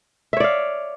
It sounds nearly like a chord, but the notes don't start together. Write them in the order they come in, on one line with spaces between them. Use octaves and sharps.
E5 C#5 D5 F5